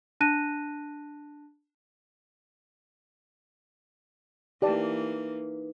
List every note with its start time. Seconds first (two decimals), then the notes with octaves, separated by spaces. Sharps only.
0.21 D4 A5 F#6 A#6 D#7
4.62 E3 A#3 D#4 G4 B4 D5 A5